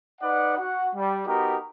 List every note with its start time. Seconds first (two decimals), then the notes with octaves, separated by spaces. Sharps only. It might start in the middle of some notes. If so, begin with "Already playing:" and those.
0.21 D#4 B4 D5 F#5
0.57 F#4 F#5
0.94 G3
1.26 B3 D#4 F#4 G4 A#4